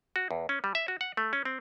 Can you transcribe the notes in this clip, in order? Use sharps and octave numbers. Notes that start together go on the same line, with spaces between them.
F#4
E2
C#4
G3
E5
F#4
F#5
A3
C#4
C4